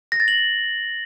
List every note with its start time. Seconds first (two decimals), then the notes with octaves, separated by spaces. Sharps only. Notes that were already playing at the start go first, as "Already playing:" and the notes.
0.12 A#6
0.20 A6
0.28 F#7